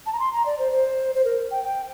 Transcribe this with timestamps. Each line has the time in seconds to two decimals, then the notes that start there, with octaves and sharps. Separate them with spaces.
0.06 A5
0.13 A#5
0.20 C6
0.33 A#5
0.46 D5
0.59 C5
0.72 C5
1.15 C5
1.25 A#4
1.51 G5
1.64 G5